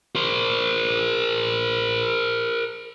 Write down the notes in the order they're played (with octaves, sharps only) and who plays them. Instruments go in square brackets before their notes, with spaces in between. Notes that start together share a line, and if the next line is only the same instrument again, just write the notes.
[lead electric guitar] A#4 C5